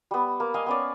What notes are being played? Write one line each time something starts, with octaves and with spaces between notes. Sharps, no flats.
G3 B3
A#3
D#5 F5 G#5
B3 C#4 D5